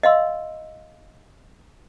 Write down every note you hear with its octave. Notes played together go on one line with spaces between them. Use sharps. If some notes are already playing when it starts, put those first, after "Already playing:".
D#5 F5 C6 E6